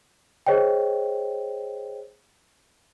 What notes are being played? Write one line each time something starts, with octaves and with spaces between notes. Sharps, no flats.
G#4 C5 C#5 D#5 G5